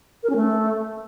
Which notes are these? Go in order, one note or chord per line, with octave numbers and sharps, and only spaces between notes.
A#4
C#4
A3